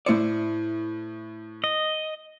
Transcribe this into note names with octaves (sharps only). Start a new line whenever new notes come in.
A2 E4 C5 D5 C#7
D#5